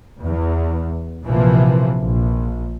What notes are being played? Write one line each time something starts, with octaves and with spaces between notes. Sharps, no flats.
E2
A#1 C3 E3 F3 A#3
A#1